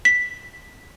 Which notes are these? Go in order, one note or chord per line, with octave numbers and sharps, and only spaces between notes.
B6